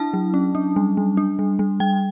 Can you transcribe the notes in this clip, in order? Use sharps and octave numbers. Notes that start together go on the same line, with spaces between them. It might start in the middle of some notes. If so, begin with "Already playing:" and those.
Already playing: D4 E4 A5
F#3
C#4
D4
G3
G3
D4
G3
G3
G3 G5